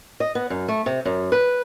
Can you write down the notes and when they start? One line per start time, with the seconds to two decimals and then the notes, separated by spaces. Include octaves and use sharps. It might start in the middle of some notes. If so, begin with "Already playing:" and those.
0.20 D#5
0.35 B3
0.50 F#2
0.68 A3
0.86 C3
1.05 F#2
1.32 B4